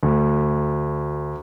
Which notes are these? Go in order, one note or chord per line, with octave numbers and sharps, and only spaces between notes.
D2